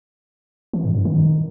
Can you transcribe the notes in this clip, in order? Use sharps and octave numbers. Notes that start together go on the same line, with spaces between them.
E3
G#2
G2
D#3